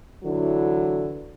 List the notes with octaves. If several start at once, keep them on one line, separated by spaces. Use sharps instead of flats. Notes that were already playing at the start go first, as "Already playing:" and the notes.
D3 E3 F#3 E4